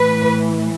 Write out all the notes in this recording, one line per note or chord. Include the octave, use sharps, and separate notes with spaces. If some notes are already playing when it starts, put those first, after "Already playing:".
Already playing: A2 E3 B4